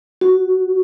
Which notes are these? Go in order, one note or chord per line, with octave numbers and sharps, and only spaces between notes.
F#4